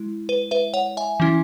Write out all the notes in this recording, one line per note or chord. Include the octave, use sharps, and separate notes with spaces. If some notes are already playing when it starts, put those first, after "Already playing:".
Already playing: G#3 E4
B4
B4 E5
C#5 F#5
E5 G#5
E3 C#4 E4